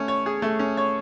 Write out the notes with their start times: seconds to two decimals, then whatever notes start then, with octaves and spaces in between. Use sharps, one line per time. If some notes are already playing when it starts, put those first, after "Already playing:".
Already playing: A3 C#4
0.08 C#5
0.26 G#4
0.42 A3
0.59 C#4
0.77 C#5